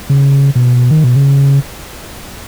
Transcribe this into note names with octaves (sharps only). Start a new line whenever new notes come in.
C#3
B2
D#3
B2
C#3